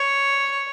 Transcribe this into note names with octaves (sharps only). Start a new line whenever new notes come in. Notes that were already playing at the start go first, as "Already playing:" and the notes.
Already playing: C#5